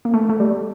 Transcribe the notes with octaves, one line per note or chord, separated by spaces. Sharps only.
A#3
A3
A3
G3